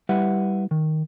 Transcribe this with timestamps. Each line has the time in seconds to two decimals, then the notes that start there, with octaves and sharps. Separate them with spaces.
0.09 G3 E4 G4 B4 E5 F#5
0.71 D#3